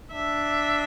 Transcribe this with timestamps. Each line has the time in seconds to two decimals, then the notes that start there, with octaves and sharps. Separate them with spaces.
0.11 D4 E5